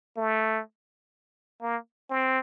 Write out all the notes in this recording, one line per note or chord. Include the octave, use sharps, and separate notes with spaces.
A3
A#3
C4